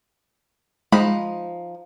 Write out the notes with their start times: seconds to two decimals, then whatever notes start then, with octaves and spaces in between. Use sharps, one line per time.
0.92 F3 G#3 D#4 B5